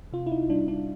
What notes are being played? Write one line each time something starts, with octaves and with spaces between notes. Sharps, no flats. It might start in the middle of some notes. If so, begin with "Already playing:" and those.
C3 F4
E4
D#4
G3 D4
D4